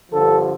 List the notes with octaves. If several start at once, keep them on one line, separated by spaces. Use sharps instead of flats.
G2 D3 F3 A4